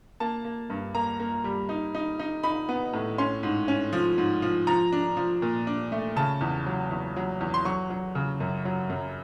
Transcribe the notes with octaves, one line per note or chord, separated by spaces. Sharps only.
A#3 A5
A#3
G2
A#3 A#5
A#3
G3
D#4
D#4
D#4
D#4 B5
B3
A2
C#4 C6
G#2
C#4
F3
G#2
F3
F3 A#5
D4
F3
A#2
D4
A3
C#3 A5
E2
F#3
E2
F#3
E2
C6
F#3 C#6
F#3
C#3
F#2
F#3
F#2